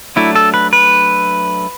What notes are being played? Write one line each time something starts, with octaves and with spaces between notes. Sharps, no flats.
F#3 A3 D4 E4
A4
B4
B4